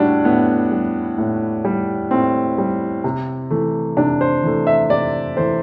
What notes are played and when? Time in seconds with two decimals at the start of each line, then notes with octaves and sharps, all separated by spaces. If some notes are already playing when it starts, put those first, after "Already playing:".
Already playing: A2 G3 D4 F#4
0.25 A2 B3
0.71 G3
1.18 A2
1.65 G3
2.11 A2 C4
2.58 G3
3.04 C3
3.51 E3 A3
3.97 C3 D4
4.21 C5
4.44 E3 A3
4.67 E5
4.90 C3 D5
5.37 E3 A3 C5